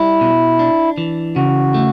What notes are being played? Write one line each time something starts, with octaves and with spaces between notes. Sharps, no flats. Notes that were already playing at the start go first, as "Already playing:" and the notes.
Already playing: G3 E4
B2
D4
E3
C#3 F#4
A3